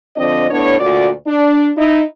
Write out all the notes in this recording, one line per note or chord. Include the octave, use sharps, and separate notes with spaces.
D3 F3 C4 D4 D#5
A2 B3 D4 C#5
D2 A#2 F#4 D5
D4
D#4 E4